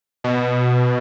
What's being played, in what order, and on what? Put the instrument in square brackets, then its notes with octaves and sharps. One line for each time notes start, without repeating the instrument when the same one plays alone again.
[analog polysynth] B2